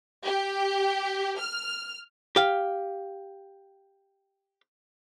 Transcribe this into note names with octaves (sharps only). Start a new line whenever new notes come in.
G4
F6
G4 F5